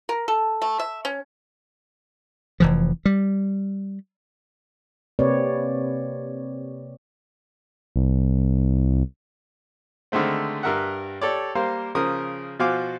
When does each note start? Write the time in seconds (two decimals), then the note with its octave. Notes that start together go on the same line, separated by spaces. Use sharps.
0.09 A#4
0.28 A4
0.62 A3
0.79 E5
1.05 C#4
2.60 F1 E3 F3
3.06 G3
5.19 C3 A#3 C4 B4 C#5 D5
7.96 C2
10.12 D3 D#3 G#3 A3 C4
10.63 G2 A#4 E5 F#5
11.21 G4 A4 C#5 D5
11.55 G3 A#3 G4 A#4 C5 F5
11.95 C#3 F3 A#4 D#6
12.59 B2 F3 F#4 F5 G#5 D6